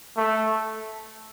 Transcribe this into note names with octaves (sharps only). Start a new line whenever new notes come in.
A3